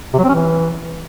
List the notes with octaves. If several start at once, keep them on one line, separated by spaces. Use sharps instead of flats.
C3
F#3
C4
C#4
E3